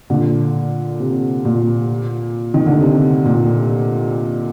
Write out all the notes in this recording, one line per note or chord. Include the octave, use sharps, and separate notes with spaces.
A#2 D3
C3
A#2
D#3
D3
C3
A#2